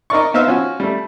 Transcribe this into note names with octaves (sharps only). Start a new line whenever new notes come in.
D#4 A#4 D5 C#6
B3 D#4 C5 E5 F5
F3 C#4 F4 F#4
G3 A3